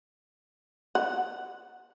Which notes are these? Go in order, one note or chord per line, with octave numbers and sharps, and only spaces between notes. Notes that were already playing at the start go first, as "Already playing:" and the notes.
F#5